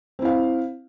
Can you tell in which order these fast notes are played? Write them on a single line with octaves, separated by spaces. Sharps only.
C4 E4 F5